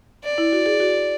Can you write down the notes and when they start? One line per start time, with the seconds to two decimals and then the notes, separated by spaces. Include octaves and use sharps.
0.24 D5
0.38 E4
0.53 F#4
0.66 G#4
0.80 F#4